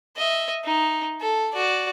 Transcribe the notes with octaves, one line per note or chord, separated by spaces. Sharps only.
D#5 E5
D#4
A4
F#4 D5